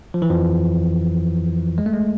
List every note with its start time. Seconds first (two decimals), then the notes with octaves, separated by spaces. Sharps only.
0.14 F3
0.22 E3
0.30 F2 F3
1.78 G#3
1.86 A3
1.94 G#3